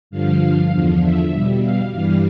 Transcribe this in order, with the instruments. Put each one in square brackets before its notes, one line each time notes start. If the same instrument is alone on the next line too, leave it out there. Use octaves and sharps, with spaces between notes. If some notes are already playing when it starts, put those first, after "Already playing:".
[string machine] G2 D3 F3 F5
E2 D3 F3
E5
B2 G3
F5
G2 E3 G3 F5